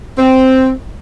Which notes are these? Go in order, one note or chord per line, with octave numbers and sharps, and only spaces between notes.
C4